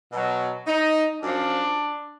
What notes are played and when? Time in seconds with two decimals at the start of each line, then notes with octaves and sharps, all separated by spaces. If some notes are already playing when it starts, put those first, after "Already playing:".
0.11 B2
0.16 F#3
0.67 D#4
1.22 F#2 F3 D4